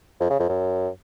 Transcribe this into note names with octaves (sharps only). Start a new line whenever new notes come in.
F2
C#3
F2
F#2